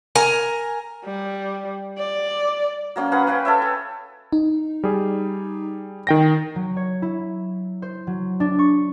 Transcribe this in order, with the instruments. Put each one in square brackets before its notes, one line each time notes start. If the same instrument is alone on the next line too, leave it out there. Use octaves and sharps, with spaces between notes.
[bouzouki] A#4 G#5 A#5
[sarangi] G3
D5
[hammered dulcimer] F#3 A#3 C#4
G#4 A#4 B4 F#5
B4 F5 G5
A4 C#5 E5
G#4
[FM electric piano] D#4
[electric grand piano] G3 G#4
D#3 G5 A#6
[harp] F#3
C#5
E4
C5
F#3
D4
C#6